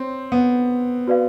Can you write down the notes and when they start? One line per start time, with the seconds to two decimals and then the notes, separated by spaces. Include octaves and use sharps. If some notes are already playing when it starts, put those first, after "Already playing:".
Already playing: C4 C#5
0.32 B3
1.07 F#4 B4 D5 F5